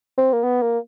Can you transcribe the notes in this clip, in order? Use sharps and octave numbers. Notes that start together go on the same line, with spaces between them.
C4
A#3
B3
A#3